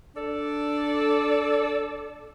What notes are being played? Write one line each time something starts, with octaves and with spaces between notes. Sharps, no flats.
D4 A4 D5